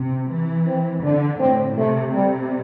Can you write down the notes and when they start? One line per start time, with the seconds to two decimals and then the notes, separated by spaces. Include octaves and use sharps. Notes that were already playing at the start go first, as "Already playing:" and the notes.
Already playing: C3
0.29 E3
0.67 C4
1.04 D3 D4
1.40 A2 C4
1.77 C3 A3
2.14 C3 G3